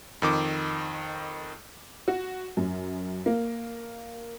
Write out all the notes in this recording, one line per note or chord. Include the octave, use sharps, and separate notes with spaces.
F2 D#3 D6
F#4
F#2
A#3